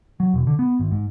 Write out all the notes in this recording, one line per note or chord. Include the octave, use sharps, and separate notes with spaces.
F#3
E1
D3
B3
G#1
G#2